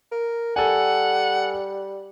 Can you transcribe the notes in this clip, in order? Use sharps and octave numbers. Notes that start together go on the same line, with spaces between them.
A#4
G3 A4 F#5 G#5